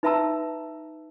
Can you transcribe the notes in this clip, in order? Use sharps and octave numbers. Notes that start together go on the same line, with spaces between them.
D#4 B4 E5 A5 A#5 E6